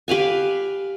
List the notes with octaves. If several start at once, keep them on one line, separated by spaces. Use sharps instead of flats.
G4 B4 F5 G#5